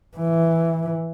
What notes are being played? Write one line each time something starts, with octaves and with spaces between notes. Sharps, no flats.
E3